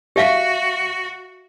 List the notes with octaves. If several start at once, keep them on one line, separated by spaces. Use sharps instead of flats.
F#4 G4 E5 F5